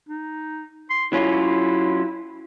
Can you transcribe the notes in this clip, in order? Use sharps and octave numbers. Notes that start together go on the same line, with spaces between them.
D#4
C6
F#3 C#4 E4 F4